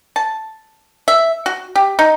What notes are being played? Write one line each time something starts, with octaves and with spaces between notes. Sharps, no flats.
A5
E5
F#4
G4
D#4